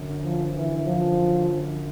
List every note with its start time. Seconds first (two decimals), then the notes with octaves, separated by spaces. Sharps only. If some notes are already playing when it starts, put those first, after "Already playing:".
Already playing: F#2 D3
0.22 F3
0.54 E3
0.84 F3